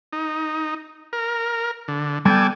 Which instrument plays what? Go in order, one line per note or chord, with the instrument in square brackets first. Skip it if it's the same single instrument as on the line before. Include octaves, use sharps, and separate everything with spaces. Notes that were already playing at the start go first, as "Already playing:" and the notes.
[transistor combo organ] D#4
A#4
D3
[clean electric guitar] G3 B3 G5 [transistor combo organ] A4 D5 G#5